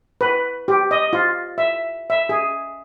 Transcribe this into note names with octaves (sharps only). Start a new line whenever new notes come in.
B4
G4
D#5
F4
E5
E5
G#4